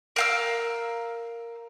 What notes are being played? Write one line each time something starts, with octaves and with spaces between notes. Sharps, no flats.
A#4 F5 E6